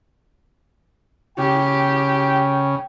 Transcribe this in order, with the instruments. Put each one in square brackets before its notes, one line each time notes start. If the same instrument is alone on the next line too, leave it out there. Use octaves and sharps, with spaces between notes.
[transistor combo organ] C#3 [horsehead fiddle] G4 [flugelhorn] G5